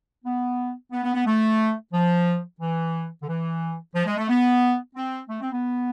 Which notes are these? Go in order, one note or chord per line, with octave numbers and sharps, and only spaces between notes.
B3
B3
B3
B3
A3
F3
E3
D3
E3
F3
G#3
A3
B3
C4
A3
C4
B3